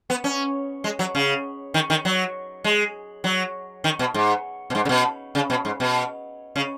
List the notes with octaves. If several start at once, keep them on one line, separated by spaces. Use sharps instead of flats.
B3
C#4
G#3
F#3
C#3
D#3
D#3
F#3
G#3
F#3
D#3
B2
G#2
B2
G#2
C#3
B2
C#3
B2
G#2
B2
C#3